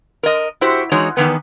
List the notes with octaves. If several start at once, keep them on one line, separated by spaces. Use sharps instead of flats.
A#4 D#5
E4 F#4 G4 C5
E3 G#3 D#4 F#4 C#5
E2 D#3 E3 B3